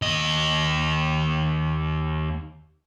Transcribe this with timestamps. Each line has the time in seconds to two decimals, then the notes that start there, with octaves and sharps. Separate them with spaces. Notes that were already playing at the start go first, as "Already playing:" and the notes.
0.02 D#2 D#5